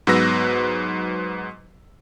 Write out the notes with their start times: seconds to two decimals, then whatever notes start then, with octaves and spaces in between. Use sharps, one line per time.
0.07 G#2 F#3 B3 B4 E6 A#6